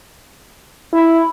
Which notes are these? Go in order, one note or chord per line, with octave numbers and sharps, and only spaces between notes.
E4